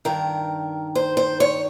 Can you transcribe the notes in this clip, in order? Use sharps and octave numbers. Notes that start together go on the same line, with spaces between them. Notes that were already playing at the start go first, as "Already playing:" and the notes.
G2 D#3 A#4
C5
C5
C#5